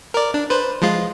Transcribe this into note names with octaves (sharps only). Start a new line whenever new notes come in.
A#4 D5
D4
B4 C5
F3 G#3 F4